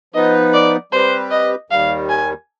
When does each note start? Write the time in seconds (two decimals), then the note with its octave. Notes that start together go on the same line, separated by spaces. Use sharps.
0.14 F3 B3 D#4 B4 D#5
0.53 D5
0.92 G3 C4 G4 B4 C5
1.31 D#5
1.70 D#2 D#3 G3 F5
2.10 G#5